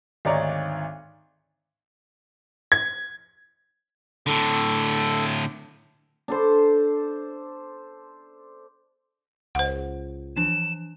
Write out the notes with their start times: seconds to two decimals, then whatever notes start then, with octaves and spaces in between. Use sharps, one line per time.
0.25 G#1 D2 D#4 C#5 D5 A#5
2.72 G#6
4.27 A2 D3 A4
6.28 D4 A4 C5
9.55 C#2 C5 F#5
10.36 E3 F3 D4 E7